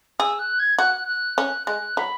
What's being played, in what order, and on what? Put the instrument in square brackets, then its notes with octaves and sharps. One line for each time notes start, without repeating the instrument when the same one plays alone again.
[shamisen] G#4 [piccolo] E6
[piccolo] F#6
G#6
[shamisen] F#4 [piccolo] F#6
[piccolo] F#6
[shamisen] C#4 [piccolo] F#6
[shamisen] G#3 [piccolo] F#6
[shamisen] F#3 [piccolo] B5